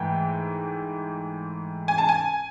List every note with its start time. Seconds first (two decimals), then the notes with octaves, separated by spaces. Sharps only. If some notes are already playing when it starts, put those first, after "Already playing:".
Already playing: G#2 E3 A3 G5
1.88 G#5
1.98 A5
2.09 G#5